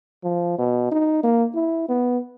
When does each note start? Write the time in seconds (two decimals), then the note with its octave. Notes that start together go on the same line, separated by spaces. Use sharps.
0.24 F3
0.58 B2
0.91 D#4
1.23 A#3
1.54 E4
1.89 B3